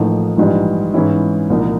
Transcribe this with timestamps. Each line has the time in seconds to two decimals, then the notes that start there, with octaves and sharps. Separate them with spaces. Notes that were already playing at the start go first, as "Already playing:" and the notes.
Already playing: A1 A2 F3 A#3 D#4
0.38 A#1 G#2 E3 G3
0.94 G#2 E3 G#3 C#4 E4
1.50 C2 A#2 F3 A#3 D#4